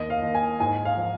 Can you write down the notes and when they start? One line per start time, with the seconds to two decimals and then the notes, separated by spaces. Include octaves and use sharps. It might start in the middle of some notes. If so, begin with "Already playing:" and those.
Already playing: D#2 D#5
0.10 F5
0.22 D#2
0.35 G#5
0.60 G#2 G#5
0.85 F5
0.97 F3